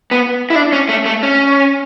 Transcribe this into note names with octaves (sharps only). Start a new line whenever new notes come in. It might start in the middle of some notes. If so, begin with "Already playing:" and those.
B3
E4
D4
C#4
A3
A3
C#4